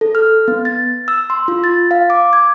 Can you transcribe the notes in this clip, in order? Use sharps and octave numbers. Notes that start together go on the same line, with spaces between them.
A4
F6
B3
A6
E6
C6
F4
A6
F5
D6
G#6